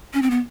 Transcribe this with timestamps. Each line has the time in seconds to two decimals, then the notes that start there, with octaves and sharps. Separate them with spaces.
0.14 C#4
0.22 C4
0.31 B3